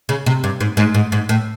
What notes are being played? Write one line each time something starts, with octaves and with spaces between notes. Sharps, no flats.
C#3
C3
G2
G#2
G#2
G#2
G#2
A2